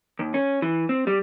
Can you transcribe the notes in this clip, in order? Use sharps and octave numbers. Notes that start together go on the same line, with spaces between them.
D#2
C#4
E3
C4
G3